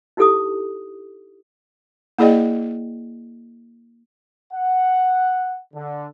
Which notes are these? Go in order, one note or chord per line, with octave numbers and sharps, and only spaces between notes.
D#4 E4 G4 A4 D6 D#6
A#3 E4 G#4 D5 D#5 G5
F#5
D3